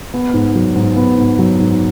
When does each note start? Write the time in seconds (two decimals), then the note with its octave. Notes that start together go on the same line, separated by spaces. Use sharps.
0.14 B3
0.34 G#2
0.55 F#3
0.76 G#2
0.97 B3
1.17 G#2
1.39 F#3
1.59 G#2